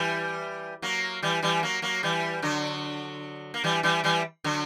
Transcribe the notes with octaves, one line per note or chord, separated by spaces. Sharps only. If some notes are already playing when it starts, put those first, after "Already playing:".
Already playing: E3 G3
F#3 A#3
E3 G3
E3 G3
F#3 A#3
F#3 A#3
E3 G3
D3 F#3
A#3
E3 G3
E3 G3
E3 G3
D3 F#3